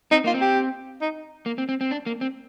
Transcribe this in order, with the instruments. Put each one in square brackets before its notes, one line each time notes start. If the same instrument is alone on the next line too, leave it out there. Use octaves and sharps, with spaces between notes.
[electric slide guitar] C4 [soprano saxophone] D#4
[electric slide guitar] A#3 [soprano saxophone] F4
[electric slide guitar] C4
[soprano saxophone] G4
D#4
[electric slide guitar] A#3
C4
C4
C4
D4
A#3
C4